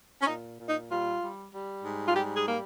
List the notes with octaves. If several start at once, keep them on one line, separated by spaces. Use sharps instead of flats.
C#4
A#2 D#4
A#2
D#4
G3 F4
G3
G3
G#2
F4
G3 G4
G#4
G3 A#3